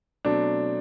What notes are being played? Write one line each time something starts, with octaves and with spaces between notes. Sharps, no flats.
B2 F#3 A3 C4 D4